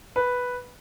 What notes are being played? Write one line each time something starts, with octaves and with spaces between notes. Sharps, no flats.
B4